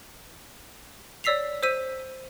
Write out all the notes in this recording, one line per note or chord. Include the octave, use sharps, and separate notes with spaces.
C#5 D5 E6 B6 C7 F7
C5 E6 B6 D#7